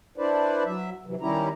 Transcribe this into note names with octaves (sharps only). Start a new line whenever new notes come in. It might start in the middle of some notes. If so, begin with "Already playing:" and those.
D4 E4 B4 C5 D5
F#3 E5
C3 E3 F#3
D#3 G3 C#4 E4 G4 A#5